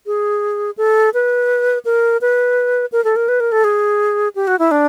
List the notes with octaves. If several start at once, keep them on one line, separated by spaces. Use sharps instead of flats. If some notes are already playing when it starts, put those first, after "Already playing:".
G#4
A4
B4
A#4
B4
A#4
A4
A#4
B4
A#4
A4
G#4
G4
F#4
E4
D4